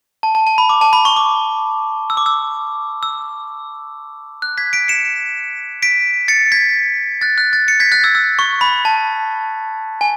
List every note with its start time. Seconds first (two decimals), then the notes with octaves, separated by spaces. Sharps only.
0.23 A5
0.35 A5
0.47 A5
0.58 B5
0.69 D6
0.81 A5
0.93 B5
1.05 C#6
1.16 D6
2.10 E6
2.17 D6
2.26 E6
3.03 E6
4.42 F#6
4.58 G#6 B6
4.73 B6 D7
4.88 C#7 E7
5.82 B6 D7
6.28 A6 C#7
6.52 G#6 B6
7.21 F#6 A6
7.38 F#6
7.53 F#6 A6
7.68 A6 C#7
7.80 G#6 B6
7.92 F#6 A6
8.03 E6 G#6
8.15 E6
8.39 C#6
8.61 B5
8.85 A5
10.01 G#5